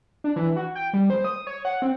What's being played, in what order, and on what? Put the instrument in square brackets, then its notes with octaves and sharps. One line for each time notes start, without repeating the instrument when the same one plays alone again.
[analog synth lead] D4
E3
F#4
G5
G3
C5
D#6
C#5
F#5
C4